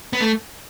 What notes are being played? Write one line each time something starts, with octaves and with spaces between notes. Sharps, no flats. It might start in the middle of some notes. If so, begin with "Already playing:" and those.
B3
A3